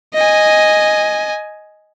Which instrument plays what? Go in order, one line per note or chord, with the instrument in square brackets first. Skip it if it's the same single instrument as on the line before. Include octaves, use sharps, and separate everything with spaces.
[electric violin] D#5 G#5